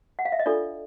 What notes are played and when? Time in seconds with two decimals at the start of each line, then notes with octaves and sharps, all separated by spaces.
0.19 F#5
0.25 F5
0.32 E5
0.39 D#5
0.46 D4 F4 A4 D5